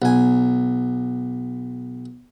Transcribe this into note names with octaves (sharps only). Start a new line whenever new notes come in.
B1 G#5